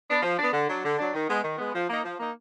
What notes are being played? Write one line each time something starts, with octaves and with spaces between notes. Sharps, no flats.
B3 D4
F3
B3 D4
D3
F#3 D4
D3
F#3 D4
D#3
G#3 B3
D#3
G#3 B3
F3
A#3 D#4
F3
A#3 D#4